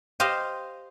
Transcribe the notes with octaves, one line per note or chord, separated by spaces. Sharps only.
G4 C5 D#5 F5